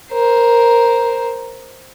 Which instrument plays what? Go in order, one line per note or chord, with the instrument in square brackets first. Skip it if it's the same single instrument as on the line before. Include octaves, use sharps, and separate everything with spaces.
[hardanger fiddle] A#4 C5